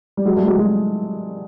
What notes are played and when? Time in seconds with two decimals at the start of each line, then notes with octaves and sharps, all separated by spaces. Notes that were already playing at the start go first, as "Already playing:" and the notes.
0.17 G3
0.25 F#3 G#3
0.37 G3 A3
0.47 F#3 G#3
0.58 F#3 G#3